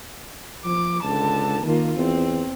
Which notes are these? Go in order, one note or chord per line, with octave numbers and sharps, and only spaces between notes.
F3 D6
C#2 D3 A5
D#3 A#3 F4
E2 C4